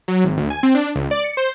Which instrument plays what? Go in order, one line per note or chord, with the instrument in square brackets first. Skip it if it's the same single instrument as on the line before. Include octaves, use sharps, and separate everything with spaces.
[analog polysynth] F#3
G#1
D2
G#5
C4
D4
C#2
D5
C#7
C5